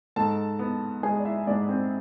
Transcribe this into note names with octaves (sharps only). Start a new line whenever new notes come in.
G#2 A4 A5
B3
G#3 G#4 G#5
D5
E4 E5
G#2 D4 D5
C4 C5